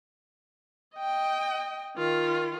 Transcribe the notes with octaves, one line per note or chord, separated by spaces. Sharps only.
D#5 G5
D#3 F4